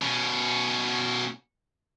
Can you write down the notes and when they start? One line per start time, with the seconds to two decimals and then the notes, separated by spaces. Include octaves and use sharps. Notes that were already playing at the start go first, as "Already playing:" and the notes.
0.02 B2 C#4